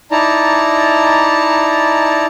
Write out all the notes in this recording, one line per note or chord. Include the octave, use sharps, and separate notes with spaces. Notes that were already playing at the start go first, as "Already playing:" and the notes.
D#4 E4 D5 A5 A#5